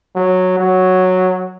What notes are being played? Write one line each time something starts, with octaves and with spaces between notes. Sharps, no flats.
F#3
F#3